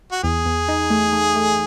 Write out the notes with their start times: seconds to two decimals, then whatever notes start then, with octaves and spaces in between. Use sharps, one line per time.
0.12 F#4
0.23 E2 G#4
0.45 E2
0.68 D#4
0.90 A3
1.13 A3
1.36 A3